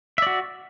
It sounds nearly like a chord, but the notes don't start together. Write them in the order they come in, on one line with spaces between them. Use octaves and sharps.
E5 D5 F#4